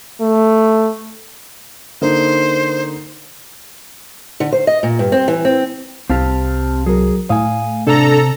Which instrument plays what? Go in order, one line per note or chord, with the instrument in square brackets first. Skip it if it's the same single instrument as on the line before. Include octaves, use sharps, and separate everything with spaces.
[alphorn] A3
[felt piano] D3 A#3 D#4 [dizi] C5
[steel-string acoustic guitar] D3
C5
D#5
A#2
G2
C4
E3
C4
[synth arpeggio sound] C2 [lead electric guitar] C4 G4 [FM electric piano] F5 A5 F6
[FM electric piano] F#3 A#4 [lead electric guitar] G#4
[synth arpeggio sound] A2 [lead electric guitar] F5 G#5 [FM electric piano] D#6
[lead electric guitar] C3 [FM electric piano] D4 [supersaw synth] A4 A#5